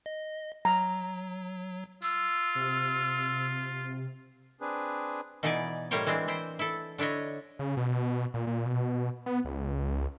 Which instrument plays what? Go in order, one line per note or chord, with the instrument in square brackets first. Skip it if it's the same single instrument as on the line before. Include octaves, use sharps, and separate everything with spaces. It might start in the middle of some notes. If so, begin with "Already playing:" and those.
[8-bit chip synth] D#5
[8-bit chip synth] F#3 [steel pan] A#5
[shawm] F4 [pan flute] E6
[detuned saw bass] C3
[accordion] C4 D4 G#4 B4
[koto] B2 E3 B3 D#4 D5 G#5
A2 G3 A#3 C5 C#5 G5
E3 G#3 C4 D4
E4 C5 G5
E4 A4
D3 D4 E4 C#5 D#5
[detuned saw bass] C#3
B2
A#2
A#2
B2
B3
C#2